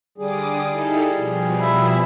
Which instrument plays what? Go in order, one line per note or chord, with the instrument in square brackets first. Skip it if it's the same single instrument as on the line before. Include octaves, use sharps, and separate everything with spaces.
[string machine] D3 D6 D#6 [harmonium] G3 G#4
[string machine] D#4 E4 A4
B2 F3
[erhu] E4